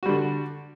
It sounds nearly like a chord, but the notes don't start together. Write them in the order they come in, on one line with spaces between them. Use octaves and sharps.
F#4 G3 D3